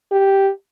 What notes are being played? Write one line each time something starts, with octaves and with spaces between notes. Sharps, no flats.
G4